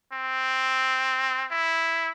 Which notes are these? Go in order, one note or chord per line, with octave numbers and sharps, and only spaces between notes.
C4
E4